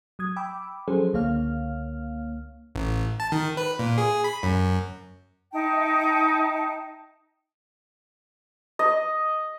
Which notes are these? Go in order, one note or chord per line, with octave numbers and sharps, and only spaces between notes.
F#3 D#6 G#6
G5 B5 D6 E6
F3 F#3 C#4 G#4 A4 C5
C#2 D3 A#3 C#5 F5 F6
A1
A5
D#3
B4
A#2
G#4
B5
F#2
D#4 E5 G5 A5
D#5